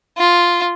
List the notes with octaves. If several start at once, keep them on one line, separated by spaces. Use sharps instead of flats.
F4